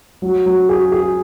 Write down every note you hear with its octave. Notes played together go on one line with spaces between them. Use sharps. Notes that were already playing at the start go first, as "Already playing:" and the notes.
F#3
F#3
G#4
G#4